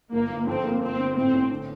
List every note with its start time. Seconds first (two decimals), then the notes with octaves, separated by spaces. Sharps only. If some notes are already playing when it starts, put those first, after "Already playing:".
0.12 G1 A#3
0.30 G1
0.47 F2 C4
0.64 A#3
0.82 G1 C4
0.98 D3
1.16 A2 C4
1.34 A1
1.50 D3